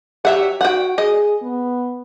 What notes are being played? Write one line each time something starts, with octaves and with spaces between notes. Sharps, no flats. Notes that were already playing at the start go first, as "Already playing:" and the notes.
F#3 G4 E5 F#5
F#4 F#5 G5
G#4 D#5
B3